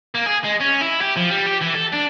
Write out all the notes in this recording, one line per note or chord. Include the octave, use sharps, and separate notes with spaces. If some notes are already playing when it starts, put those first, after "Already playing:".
A#3
G#4
G#3
C#4
E4
G4
F3
G3
G4
E3
A4
D4